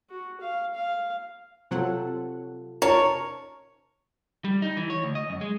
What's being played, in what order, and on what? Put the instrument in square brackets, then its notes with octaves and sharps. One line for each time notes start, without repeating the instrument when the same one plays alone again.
[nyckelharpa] F#4
F5
F5
[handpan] C3 F4 A4 [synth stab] F#3 C4 F#5
[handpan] C#4 D#4 [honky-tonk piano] A#4 [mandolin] C#5 [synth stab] A5
[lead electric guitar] G3
D#4
E3
C#5
D2
D#5
F#2
G#3